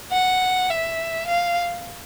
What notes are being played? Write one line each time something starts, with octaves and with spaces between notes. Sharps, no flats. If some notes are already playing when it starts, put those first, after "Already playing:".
F#5
E5
F5